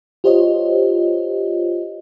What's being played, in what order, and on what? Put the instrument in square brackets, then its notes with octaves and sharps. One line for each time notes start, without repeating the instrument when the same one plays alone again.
[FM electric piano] F4 G4 C5 C#5 D#5